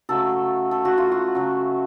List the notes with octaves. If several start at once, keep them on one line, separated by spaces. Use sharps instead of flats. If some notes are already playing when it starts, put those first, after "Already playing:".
C#3 F#3 A3 A4
A4
F#4
F4
F#4
C#3 F#3 A3